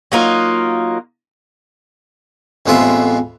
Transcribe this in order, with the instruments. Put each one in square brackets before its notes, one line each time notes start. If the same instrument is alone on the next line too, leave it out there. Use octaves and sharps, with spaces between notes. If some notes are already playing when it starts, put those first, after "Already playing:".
[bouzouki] F#3 A#3 D#4 F4
[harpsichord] A1 F2 G#3 B3 F4 E5